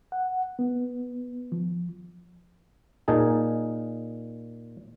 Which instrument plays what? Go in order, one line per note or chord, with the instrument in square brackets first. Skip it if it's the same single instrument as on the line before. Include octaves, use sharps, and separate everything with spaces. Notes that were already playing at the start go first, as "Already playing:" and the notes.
[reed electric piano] F#5
B3
F3
[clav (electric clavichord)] A#2 D#4 G#4 A5